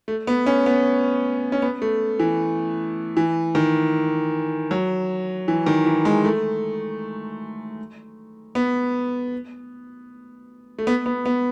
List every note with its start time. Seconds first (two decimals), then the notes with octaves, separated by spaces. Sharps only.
0.08 A3
0.27 B3
0.46 C#4
0.66 B3
1.52 C#4
1.62 B3
1.82 A3
2.19 E3
3.17 E3
3.55 D#3
4.71 F#3
5.48 E3
5.66 D#3
5.86 E3
6.05 G#3
6.25 A3
8.55 B3
10.79 A3
10.87 B3
11.06 B3
11.26 B3